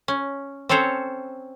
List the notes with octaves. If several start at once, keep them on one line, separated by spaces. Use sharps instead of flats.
C#4
C4 C#4 A4 C5 C#5